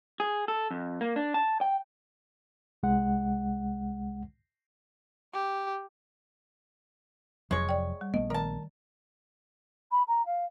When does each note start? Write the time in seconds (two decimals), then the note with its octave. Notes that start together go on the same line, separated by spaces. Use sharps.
0.20 G#4
0.48 A4
0.71 F2
1.01 A#3
1.16 D4
1.34 A5
1.61 G5
2.83 C2 G#3 F#5
5.33 G4
7.51 F1 F2 F#3 G#3 C#5
7.69 D5 G5
8.01 G3
8.14 A#1 A3 B3 D#5
8.30 D#3 A#4 A5
9.91 B5
10.07 A#5
10.25 F5